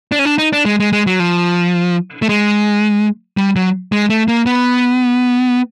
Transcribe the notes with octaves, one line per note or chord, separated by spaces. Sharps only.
D4
C#4
D4
D#4
D4
G#3
G#3
G#3
F#3
F3
A3
G#3
G3
F#3
G#3
A3
A#3
B3